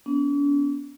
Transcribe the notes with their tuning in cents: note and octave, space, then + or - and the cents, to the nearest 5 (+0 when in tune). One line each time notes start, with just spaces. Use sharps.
B3 +0 D4 -45